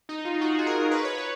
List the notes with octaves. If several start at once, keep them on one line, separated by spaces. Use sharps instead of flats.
D#4
F4
F4
F#4
G#4
A#4
B4
C#5
B4